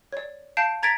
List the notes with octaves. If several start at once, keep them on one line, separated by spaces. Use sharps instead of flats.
C#5 D5
F5 A5 G6 C7 D7
A#5 G#6 A6 B6 D7